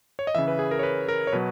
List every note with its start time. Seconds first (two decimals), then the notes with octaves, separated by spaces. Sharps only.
0.19 C#5
0.27 D#5
0.35 C#3 E3 E5
0.48 B4
0.59 G#4
0.71 A#4
0.79 C#5
0.83 B4
1.09 A#4
1.27 C#5
1.32 B2 F#3 B4